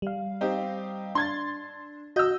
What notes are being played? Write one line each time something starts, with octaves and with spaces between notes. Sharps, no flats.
G3 F5
C4 D#4 G4
D4 C6 G#6 A6
F#4 D#5 E6 G6